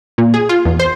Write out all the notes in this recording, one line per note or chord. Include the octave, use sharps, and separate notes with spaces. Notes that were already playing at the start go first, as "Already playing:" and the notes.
A#2
G#4
F4
E2
C5